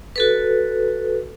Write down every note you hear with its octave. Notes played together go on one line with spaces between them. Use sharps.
F#4 A4 B4